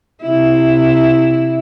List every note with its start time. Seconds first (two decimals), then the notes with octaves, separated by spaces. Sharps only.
0.22 C3 E4